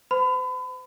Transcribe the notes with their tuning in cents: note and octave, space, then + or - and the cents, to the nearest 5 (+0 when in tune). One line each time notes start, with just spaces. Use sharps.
C5 -40 B5 +35